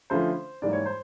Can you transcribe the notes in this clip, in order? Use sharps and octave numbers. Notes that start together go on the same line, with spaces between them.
D3 F3 A3 C#4 E4 C5
G#2 E3 G3 A#3 D5
C#5
C5